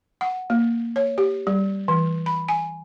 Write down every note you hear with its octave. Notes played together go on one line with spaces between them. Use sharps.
F#5
A#3
C#5
G4
G3
E3
B5
G#5